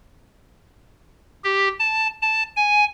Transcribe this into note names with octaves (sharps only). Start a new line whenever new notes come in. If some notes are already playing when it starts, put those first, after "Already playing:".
G4
A5
A5
G#5